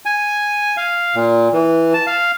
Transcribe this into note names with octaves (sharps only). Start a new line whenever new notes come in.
G#5
F5
A#2
E3
A5
F5